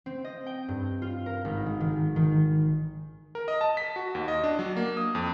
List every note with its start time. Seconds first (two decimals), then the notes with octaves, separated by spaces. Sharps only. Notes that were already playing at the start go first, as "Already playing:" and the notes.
0.06 C4
0.24 D#5
0.46 G5
0.68 G2
1.02 F4
1.26 A#4
1.45 G#1
1.66 G#3
1.80 D#3
2.16 D#3
3.35 A#4
3.48 D#5
3.61 A5
3.77 B6
3.96 F#4
4.15 D#2
4.28 D#5
4.44 D4
4.59 F#3
4.77 A#3
4.97 D#6
5.15 F2